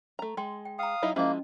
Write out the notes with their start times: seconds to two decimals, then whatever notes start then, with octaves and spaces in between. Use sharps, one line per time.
0.19 A3 A#5
0.37 G#3 G5 C6
0.65 G5
0.79 F5 G5 A#5 D#6
1.03 F#3 D#4 E4
1.16 F3 G#3 A#3 C#4 E4 D#5